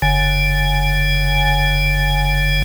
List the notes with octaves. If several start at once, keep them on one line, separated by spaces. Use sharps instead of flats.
F#1 D3 G#5